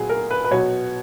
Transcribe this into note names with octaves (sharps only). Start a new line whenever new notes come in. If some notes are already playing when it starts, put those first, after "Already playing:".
Already playing: A#2 F#3 B3 G#4
A#4
B4
B4
B2 F#3 B3 C#5